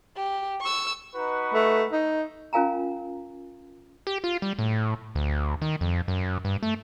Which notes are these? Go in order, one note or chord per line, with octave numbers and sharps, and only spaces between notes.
G4
C#6 E6
D#4 F#4 B4
A3
D#4
C#4 F4 A#4 F5 G#5 A#5
G4
F4
G3
A2
D2
D#3
F2
F#2
G2
A3